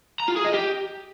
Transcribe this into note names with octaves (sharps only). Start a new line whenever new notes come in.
A#5
F4
G#4
D#5
G4